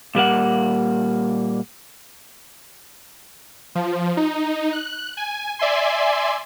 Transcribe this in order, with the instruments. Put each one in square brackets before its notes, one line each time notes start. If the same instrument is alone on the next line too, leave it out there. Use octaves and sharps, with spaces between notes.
[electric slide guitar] A#2 G3 A#3 F#5
[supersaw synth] F3
D#4
F#6
G#5
D5 E5 G#5 C6